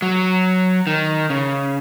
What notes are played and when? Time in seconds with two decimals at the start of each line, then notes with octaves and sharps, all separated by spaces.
0.02 F#3
0.87 D#3
1.30 C#3